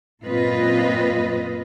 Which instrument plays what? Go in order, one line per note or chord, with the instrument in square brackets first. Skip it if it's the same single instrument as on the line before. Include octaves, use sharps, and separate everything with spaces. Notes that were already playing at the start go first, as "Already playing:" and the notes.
[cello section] F#2 A#2 C4 F4 B4 D#5